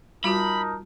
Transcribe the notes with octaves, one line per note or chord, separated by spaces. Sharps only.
G3 D#4 F4 F#4 A#4 A5 B5